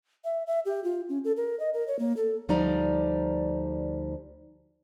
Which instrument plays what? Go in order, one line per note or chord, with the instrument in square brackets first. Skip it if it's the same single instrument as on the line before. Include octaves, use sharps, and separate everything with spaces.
[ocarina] E5
E5
G4
F4
C#4
A4
A#4
D#5
A#4
C#5
A#3
A4
[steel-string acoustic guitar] D2 F3 G3 D#4 D5 A#5